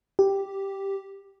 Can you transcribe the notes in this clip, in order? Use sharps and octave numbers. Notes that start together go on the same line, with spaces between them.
G4